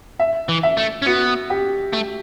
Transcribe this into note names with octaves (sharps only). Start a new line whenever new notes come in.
E5
E3
E5
A3
C#4
B3 F#4
G4
A3